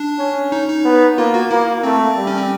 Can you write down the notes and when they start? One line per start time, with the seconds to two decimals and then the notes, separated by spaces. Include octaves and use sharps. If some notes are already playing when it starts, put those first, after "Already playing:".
Already playing: D4
0.19 C#4
0.52 D#4
0.68 D#4
0.85 B3
1.18 A#3 F4
1.34 F#4
1.51 A#3 E4
1.83 A3 C4
2.17 G3
2.27 C#4
2.38 C4